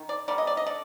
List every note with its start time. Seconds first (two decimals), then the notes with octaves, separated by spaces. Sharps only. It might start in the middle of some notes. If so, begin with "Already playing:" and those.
Already playing: D#3
0.09 D5
0.28 D3 G3 A#3 D5
0.38 D#5
0.47 D5
0.57 D#5
0.66 D3 D5